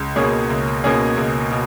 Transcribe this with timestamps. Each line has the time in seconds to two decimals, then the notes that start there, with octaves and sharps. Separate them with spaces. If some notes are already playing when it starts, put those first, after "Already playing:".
Already playing: C#2
0.16 B2 A#3 C#4 G#4
0.50 C#2
0.84 B2 A#3 C#4 G#4
1.18 C#2
1.51 B2